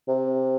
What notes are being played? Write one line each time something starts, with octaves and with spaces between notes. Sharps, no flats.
C3